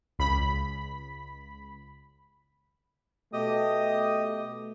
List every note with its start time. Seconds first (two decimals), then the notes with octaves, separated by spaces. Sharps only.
0.19 C#2 B5 B6
3.33 B2 A3 G4 D#5 D#6